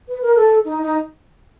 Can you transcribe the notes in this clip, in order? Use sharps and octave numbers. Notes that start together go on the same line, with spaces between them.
B4
A#4
A4
D#4
D#4